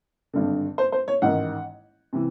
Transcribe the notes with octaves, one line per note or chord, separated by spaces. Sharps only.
G#1 G2 D3
C5
C5
C#5
A1 G#2 D#3 F#5
C3 E3